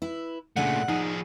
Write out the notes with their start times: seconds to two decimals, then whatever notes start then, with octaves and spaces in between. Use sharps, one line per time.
0.02 E4 B4
0.56 A#2 C#3 A3 D4 F#5 G#5
0.88 F3 D#4 G#4